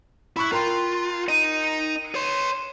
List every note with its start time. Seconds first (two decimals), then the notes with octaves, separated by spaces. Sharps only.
0.36 E4 B5 C#6 F#6
0.52 F4 A#4 G5 C6
1.28 D#4 D#5 D#7
2.15 C#5 C6